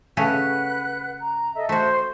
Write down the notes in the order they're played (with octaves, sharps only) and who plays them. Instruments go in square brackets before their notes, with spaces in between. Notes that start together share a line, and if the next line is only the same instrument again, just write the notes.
[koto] C#3 A3 C#4 [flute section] B4 F#5 F#6
[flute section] A#5
A4 D#5 E5
[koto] A3 F#4 [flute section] C5